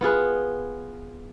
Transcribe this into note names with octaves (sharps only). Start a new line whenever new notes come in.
B3 F4 G#4 B4